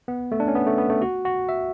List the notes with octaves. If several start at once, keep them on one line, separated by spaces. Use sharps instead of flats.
B3
A3
D4
C#4
B3
A3
B3
A3
F#4
F#4
E5